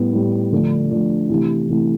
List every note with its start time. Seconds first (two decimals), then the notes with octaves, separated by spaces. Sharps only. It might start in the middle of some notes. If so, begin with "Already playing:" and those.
Already playing: A2 G3 B3
0.13 A2 G3 B3
0.52 D3 F3 A3 D4
0.90 D3 F3 A3 D4
1.29 C3 E3 A3 E4
1.68 C3 E3 A3 E4